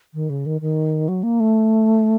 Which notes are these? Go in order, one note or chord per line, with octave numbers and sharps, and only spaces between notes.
D#3
C#3
D#3
D#3
F#3
A#3
A3